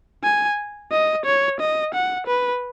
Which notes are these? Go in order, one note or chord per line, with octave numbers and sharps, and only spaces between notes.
G#5
D#5
C#5
D#5
F#5
B4